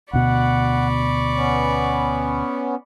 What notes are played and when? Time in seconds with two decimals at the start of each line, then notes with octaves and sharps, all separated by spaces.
0.13 D2 B2 D5 F#5 B5 C#6
1.36 B3 C#4